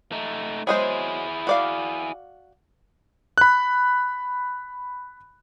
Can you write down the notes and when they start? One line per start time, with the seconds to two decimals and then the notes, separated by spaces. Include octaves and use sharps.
0.12 A3 D#4
0.67 F#3 G#3 E4 G#4 C5
1.47 F#4 D5 F5
3.38 B5 F#6